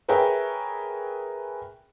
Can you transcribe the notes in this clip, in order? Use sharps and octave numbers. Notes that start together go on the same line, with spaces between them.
G#4 A#4 B4 C#5 E5 G5